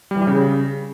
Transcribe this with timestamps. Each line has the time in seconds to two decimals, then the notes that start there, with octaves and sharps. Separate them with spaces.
0.11 G3
0.16 E3
0.22 G3
0.27 C#3